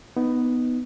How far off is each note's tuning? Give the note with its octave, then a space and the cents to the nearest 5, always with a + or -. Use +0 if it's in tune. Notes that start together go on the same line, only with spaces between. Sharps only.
B3 +10 D#4 +0